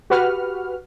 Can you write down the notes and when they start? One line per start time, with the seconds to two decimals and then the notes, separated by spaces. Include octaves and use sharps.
0.10 F#4 G4 B4 F#5 F6